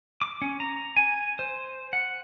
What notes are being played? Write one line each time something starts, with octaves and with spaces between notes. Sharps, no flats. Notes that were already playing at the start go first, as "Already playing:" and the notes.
D6
C#4
A#5
G#5
C5
F#5